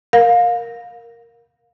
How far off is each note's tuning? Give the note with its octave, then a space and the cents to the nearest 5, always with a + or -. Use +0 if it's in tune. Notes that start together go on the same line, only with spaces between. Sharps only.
A#4 +0 F5 +25